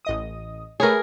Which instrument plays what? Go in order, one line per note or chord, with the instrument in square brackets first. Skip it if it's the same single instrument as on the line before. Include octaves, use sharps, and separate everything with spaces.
[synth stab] A1 D#5 D#6
[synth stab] A3 B4 C#5 [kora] G#4 A#4